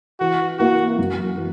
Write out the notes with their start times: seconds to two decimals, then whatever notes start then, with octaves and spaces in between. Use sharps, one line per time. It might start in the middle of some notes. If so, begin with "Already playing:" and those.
0.20 E3 F#4
0.59 A#3 E4 F#4
0.98 F#2
1.37 E3